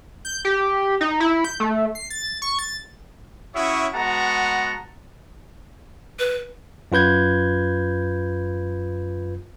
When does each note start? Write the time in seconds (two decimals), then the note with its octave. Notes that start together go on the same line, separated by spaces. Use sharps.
0.25 G6
0.45 G4
1.01 D#4
1.20 E4
1.44 G6
1.60 A3
1.95 C7
2.10 A6
2.42 C#6
2.59 A6
3.54 C#4 E4 F#4 C#5 E5 D#6
3.94 G#3 B3 F#4 F#5 A5 A#5
6.19 B4
6.92 F#2 F4 B4 G6 G#6